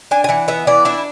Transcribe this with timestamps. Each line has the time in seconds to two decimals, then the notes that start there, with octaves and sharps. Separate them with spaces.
0.11 D4 G#5
0.24 G#5
0.29 E3 F#5
0.48 B3 E5
0.67 E3 D5
0.85 D4 E4